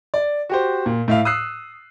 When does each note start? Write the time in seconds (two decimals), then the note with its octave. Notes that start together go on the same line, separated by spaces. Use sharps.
0.14 D5
0.49 F#4 G4 C5
0.86 A#2
1.08 A2 E5 F5
1.25 D#6 E6 F#6 C7